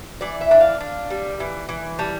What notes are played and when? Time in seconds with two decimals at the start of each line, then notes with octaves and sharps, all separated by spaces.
0.21 E3 D5
0.41 E5
0.51 D4
0.61 F5
0.80 D4
1.10 G3
1.40 E3
1.69 E3
1.99 G3 A5